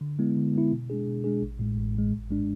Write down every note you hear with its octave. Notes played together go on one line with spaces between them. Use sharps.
D3
G#3 B3 E4
D3
G#3 B3 E4
B2
G#3 D4 G#4
B2
G#3 D4 G#4
A1
A2 G#3
A1
A2 G#3
G#1
G#2 G#3 D4